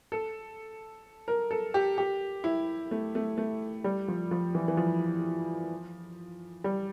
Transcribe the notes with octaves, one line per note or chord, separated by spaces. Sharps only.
A4
A#4
A4
G4
G4
E4
A3
A3
A3
G3
F3
F3
E3
E3
F3
G3